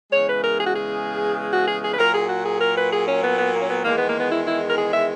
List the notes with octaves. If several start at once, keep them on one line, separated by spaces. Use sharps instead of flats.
E2 C#3 G#3 C#5
B4
A#4
G#4
F#4
G#4
F#4
G#4
G#4
B4
A#2 F#3 A#4
G#4
F#4
G#4
A#4
B4
G#4
C#4
B3
B3
A#3
C#4
B3
E2 D#3 G#3 A#3
B3
A#3
B3
E4
E4
A#4
G#4
E5